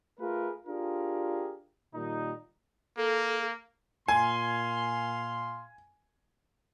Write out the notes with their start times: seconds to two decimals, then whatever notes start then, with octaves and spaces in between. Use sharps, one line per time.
0.20 A3 F4 G#4 A#4 B4
0.67 D4 F4 G4 G#4 A#4
1.95 A#2 D#3 G3 D#4
2.97 A#3 A4
4.08 A#2 F5 G#5 C6